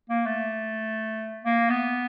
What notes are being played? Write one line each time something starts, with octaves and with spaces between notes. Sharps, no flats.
A#3
A3
A#3
B3